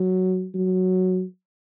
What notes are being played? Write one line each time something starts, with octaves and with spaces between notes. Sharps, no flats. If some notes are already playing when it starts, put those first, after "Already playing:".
Already playing: F#3
F#3